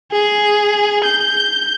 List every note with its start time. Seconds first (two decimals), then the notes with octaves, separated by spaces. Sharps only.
0.12 G#4
1.04 G6